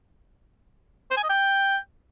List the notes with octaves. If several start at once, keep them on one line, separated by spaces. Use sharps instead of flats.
C5
G#5
D#5
G5